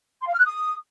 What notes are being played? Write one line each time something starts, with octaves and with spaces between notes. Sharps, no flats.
C6
F5
F6
F#6
D#6